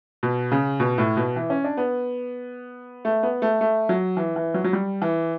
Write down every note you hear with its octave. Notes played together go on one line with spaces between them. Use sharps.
B2
C#3
B2
A2
B2
E3
C#4
D4
B3
A3
B3
A3
A3
F#3
E3
E3
F#3
F#3
G3
E3